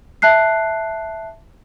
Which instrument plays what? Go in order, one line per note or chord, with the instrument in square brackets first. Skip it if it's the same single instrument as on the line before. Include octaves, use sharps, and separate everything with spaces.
[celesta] E5 A5 F#6 C7